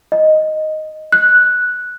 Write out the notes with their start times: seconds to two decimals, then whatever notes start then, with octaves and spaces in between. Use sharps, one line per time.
0.12 D#5
1.12 F#6